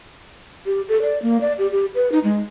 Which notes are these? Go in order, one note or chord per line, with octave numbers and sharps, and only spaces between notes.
G4
A4
D5
A#3
D5
G4
G4
B4
D#4
G#3